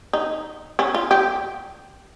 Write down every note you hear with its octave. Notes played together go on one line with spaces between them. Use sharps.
D#4
C#4
F4
G4